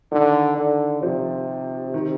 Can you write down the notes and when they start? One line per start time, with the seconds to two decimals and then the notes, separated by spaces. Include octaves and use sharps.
0.12 D3 D#3
0.57 D3
1.02 C3 F3
1.94 D#3